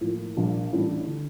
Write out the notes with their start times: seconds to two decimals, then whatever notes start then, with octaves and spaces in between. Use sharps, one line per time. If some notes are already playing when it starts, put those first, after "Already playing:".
0.01 A2 F3 A#3
0.36 A#1 A#2 G3 A#3 D4
0.72 A1 A2 G3 D4 F4
1.07 D3